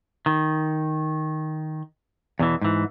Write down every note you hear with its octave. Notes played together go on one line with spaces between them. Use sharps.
D#3
E2 B2 E3
G#2 E3